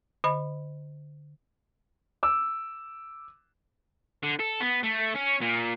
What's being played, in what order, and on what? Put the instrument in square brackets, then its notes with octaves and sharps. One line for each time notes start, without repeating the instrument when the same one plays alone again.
[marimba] D3 D#5 B5
[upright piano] D6 E6
[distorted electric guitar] D3
A4
B3
A3
C#4
A#2